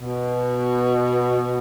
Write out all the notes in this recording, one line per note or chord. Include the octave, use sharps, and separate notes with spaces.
B2